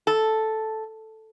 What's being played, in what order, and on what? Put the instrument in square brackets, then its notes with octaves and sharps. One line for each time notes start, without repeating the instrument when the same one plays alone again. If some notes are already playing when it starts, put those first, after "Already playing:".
[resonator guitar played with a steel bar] A4